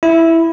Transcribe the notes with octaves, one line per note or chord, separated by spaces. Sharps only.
E4